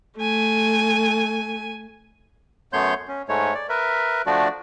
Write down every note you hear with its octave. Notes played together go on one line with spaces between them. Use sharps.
A3 G#5
F#2 A3 B3 C#5 C6 G6
C#4
G#2 G#3 A3 C#5
D5
A#4 B4 E5
F3 A3 D4 F#4 D5